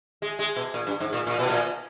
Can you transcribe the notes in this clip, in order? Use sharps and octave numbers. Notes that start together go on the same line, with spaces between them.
G#3
G#3
B2
A#2
G2
G#2
A#2
A#2
B2
A#2